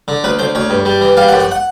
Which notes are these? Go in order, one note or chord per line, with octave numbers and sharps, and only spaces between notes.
D3
D2 B4
D2 C5
D2 C#5
G2
G3
E3
G3 F5
F#5
F#2
F#5
F#5